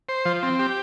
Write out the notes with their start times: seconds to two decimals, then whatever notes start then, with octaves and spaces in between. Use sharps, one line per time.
0.09 C5
0.25 F3
0.43 C4
0.59 G4